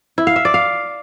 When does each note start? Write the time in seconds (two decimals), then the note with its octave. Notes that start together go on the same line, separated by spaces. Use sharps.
0.18 E4
0.27 F5
0.36 E5
0.45 D5
0.54 F5